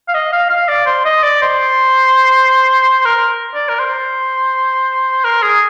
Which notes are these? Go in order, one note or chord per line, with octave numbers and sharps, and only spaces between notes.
F5
D#5
F5
F5
D5
C5
D#5
D5
C5
A#4
D5
A#4
C5
A#4
G#4